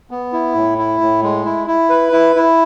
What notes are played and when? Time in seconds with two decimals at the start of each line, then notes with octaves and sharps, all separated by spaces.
0.11 B3
0.33 E4
0.55 A2
0.78 E4
1.01 A2
1.23 G#3
1.45 E4
1.67 E4
1.90 B4
2.13 E4
2.36 E4